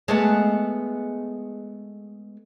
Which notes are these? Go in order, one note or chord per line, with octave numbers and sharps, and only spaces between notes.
G#3 A3 B3